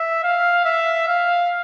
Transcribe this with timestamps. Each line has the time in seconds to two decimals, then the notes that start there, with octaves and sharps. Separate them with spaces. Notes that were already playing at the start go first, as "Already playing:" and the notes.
Already playing: E5
0.24 F5
0.65 E5
1.08 F5